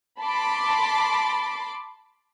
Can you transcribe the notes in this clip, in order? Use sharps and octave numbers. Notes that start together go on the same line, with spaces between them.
A5 B5 C6 D6